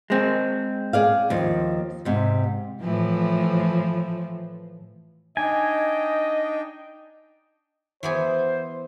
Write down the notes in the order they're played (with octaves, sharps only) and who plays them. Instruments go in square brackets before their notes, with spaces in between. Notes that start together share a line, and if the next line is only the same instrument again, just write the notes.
[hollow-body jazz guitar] G#3 C4
[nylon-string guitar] G#4 D5 F5
D#2 F3
G#2 C3
[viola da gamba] A2 E3 F3
[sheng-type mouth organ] D4 D#4 G5 [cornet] D#5 [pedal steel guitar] G#5
[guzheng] E3 B3 G#4 [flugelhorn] C5